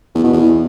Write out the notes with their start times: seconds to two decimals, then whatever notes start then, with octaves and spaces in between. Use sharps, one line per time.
0.15 E2
0.24 B2
0.33 E2